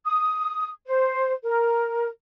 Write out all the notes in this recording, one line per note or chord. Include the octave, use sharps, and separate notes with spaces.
D#6
C5
A#4